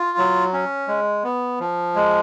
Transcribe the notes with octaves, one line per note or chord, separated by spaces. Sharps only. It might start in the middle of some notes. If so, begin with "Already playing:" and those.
Already playing: F4
F#3
C#4
G#3
B3
F3
G#3